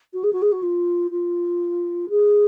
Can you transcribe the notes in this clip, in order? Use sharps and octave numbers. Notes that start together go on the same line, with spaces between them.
F#4
G#4
F#4
G#4
F#4
F4
F4
G#4